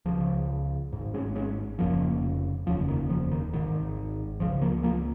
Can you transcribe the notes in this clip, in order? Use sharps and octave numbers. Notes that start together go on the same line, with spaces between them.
C#2 C#3 F3
G#1 G#2
G#3 C#4
G#3 C#4
F1 F2 C#3 F3 A#3
F1 D#2 C#3 F3
D#3
F3
D#3
G#1 G#2 D#3
C#2 C#3 F3
F3 A#3
F3 A#3